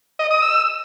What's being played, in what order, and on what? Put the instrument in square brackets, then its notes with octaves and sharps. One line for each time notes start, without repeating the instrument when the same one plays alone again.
[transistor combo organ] D#5
D#6
E6